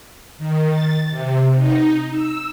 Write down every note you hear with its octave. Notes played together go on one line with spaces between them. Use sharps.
D#3
A6
C3
D#4
E6